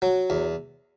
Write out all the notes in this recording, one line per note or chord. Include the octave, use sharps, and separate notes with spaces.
F#3
E2